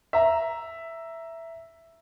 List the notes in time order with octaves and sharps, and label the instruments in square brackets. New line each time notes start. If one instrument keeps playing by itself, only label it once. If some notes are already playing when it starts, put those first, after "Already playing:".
[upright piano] E5 A#5